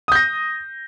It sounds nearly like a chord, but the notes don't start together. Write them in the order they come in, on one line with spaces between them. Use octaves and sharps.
D#6 G6 A#6